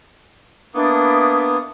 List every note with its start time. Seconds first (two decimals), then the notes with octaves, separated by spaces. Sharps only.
0.74 A#3 B3 D4 E4 D#6